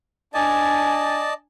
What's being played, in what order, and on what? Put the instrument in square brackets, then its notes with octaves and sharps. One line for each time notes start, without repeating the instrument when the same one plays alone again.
[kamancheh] D4 G#5 [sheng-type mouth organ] D5 D#5 A5